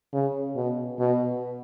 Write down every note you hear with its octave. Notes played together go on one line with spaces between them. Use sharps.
C#3
B2
B2